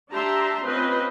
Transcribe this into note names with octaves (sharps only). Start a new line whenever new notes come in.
D4 G4 E5 A5 A#5 C6
C4 C#4 F4 B4 D#5